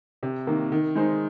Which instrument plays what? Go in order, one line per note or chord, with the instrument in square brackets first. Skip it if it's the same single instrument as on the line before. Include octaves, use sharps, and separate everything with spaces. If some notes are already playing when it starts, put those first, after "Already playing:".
[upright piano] C3
D#3 A#3
D#3
G#3 D#4 C5